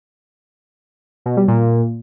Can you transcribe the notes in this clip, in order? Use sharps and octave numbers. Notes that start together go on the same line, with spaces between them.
B2
G3
A#2